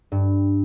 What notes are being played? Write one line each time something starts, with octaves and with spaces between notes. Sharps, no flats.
G2